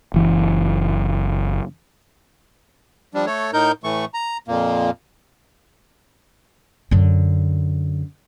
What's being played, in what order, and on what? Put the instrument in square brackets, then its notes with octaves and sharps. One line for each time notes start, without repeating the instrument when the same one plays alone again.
[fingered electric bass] F#1 E3
[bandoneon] F3 G3 D4
A3 A4 C#5
A2 D#4 A#4 G6
A2 E3 A3 C#6
A#5
F2 A#2 A#3
[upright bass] F#2 D3